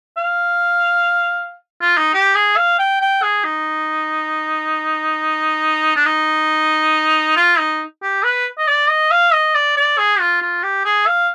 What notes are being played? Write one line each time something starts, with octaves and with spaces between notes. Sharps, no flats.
F5
F4
D#4
G4
G#4
F5
G5
G5
G#4
D#4
D4
D#4
F4
D#4
G4
B4
D#5
D5
D#5
F5
D#5
D5
D5
G#4
F4
F4
G4
G#4
F5